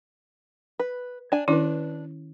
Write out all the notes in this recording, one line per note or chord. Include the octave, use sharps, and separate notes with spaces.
B4
D4 G#5
D#3 C#4 D4 E4 B4